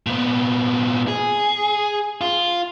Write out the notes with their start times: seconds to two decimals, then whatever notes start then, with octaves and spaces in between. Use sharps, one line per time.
0.07 A#2 B3
1.08 G#4
2.21 F4